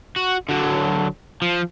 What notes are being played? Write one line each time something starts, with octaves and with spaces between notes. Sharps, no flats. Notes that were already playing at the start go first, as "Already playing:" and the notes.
F#4
D3 F#3
F3